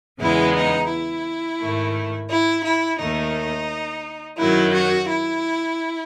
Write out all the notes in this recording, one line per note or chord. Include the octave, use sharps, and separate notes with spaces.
E2 C#3 G#3 B3 E4
D#4
E4
G#2 D#3 A3
E4
E4
D#2 D#3 A3 D#4
F#2 D#3 F#3 E4
F#4
E4